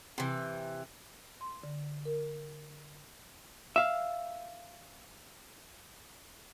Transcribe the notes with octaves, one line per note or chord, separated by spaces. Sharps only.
C3 E3
C6
D3
A#4
E5 F5